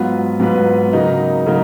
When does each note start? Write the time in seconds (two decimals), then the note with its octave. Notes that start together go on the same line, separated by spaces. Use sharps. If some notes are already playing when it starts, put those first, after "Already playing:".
Already playing: G#2 F#3 B3 F4 B4
0.40 G#2 F#3 B3 F4 B4
0.93 C#3 F#3 A#3 D#4
1.46 C#3 F#3 A#3 D#4